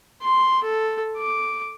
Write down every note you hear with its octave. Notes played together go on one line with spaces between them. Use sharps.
C6
A4
D6